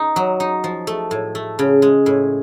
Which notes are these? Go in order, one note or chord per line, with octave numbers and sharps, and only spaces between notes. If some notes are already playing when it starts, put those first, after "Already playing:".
Already playing: D#4
F#3
D#4
F3
A3
A2
A3
C#3
G#3
A2